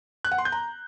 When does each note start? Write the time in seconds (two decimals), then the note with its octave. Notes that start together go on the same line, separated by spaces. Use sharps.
0.25 F#6
0.31 F#5
0.38 C6
0.45 G6
0.52 A#5